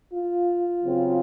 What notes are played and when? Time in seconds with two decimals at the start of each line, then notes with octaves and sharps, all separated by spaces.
0.12 F4
0.83 C#3 F#3 C4